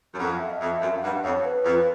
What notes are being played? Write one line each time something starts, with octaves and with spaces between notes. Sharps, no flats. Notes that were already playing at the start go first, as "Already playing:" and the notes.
F#2
F2 F#5
F5
E5
D#5
F2 E5
F#2
F5
G2 F#5
F2 C#5
B4
F2